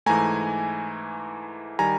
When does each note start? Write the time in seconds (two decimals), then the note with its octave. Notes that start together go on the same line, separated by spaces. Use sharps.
0.06 G#2 E3 A3 G#5 A#5
1.79 D#3 G3 G#5 A#5